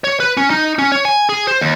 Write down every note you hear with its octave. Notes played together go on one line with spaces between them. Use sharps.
C#5
B4
C#4
D#4
C#4
C#5
G#5
G#4
C5
D#2